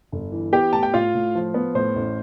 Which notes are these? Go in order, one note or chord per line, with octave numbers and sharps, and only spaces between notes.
G1
E3
B3 G4 G5
A2 A5
G5
A2 F4 F5
A2
F3
B3
A2 C5
A1